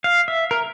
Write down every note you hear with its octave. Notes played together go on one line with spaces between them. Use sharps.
F5
E5
A#4